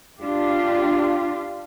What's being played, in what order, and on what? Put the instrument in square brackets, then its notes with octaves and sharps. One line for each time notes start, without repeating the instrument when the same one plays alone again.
[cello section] D4 F4 G4